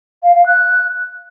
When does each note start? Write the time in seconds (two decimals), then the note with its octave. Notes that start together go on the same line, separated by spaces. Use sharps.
0.23 F5
0.34 F5
0.46 F#6